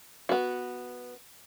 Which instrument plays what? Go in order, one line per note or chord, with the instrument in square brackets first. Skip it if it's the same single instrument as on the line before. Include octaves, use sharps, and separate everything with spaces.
[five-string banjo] B3 F#4